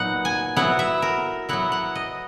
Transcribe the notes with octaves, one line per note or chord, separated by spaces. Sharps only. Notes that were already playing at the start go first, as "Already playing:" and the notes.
Already playing: A#2 F#3 B3 D#4 F#5
G#5
F#3 B3 E4 F#5
E5
A#4
F#3 B3 E4 F#5
F#5
D#5